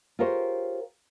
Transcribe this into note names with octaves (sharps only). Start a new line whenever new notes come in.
F4 G4 G#4 A#4 C5 C#5